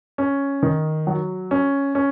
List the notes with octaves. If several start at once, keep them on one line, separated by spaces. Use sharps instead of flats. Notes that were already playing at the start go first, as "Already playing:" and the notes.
C#4
D#3
F#3
C#4
C#4